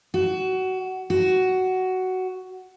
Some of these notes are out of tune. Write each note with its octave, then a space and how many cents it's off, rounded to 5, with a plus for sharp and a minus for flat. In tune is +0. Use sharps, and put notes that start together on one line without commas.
F#4 +20
F#4 +10